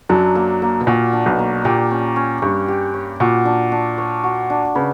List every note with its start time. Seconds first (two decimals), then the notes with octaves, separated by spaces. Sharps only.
0.09 F#2 F#3 D4
0.35 A#3
0.62 A#3
0.80 B2
0.87 A#2 F#4
1.13 D4
1.26 B1 B2
1.39 A#3
1.65 A#2 G4
1.91 C#4
2.16 C#4
2.42 G2 C#5
2.68 G4
2.94 C#4
3.20 A#2 F#4
3.45 D4
3.72 D4
3.98 C#5
4.24 F#4
4.50 D4
4.75 C#3 B4